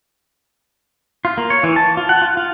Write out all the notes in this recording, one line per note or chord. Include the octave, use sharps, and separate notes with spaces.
F4
A#3
C#5
E3
A5
F4
F#5
F4
F4